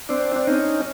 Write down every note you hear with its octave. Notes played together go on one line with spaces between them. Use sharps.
C4 D4
D4
C#4 D#4